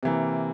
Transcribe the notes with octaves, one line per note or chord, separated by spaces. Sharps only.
C3 E3 A#3